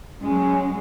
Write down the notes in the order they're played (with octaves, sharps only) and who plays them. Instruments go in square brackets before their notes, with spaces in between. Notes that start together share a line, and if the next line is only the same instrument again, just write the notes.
[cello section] F#3 G#3 [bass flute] C#4